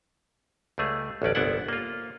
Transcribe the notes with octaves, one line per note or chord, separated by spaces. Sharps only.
C#2 G3 A3 G#4
A1 D2 C#4 D5
G1 C2 B3 D4 E4 F#5
A#3 F4